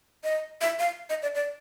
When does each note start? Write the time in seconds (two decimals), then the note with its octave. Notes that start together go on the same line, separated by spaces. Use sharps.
0.24 D#5
0.61 E5
0.79 F5
1.10 D#5
1.22 D5
1.35 D5